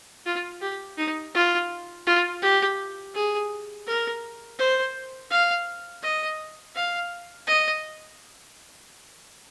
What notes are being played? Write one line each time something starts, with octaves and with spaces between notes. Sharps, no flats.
F4
G4
D#4
F4
F4
G4
G#4
A#4
C5
F5
D#5
F5
D#5